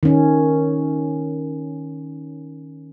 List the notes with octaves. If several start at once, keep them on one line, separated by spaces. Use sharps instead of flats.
D#3 C#4